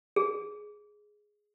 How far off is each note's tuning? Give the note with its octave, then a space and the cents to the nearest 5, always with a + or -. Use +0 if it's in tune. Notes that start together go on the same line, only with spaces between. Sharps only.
G#4 +5